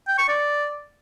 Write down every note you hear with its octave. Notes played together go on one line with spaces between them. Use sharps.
G5
C#6
D5